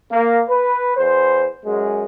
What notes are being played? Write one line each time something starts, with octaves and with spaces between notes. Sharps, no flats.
A#3
B4
E2 C5
F#2 G#3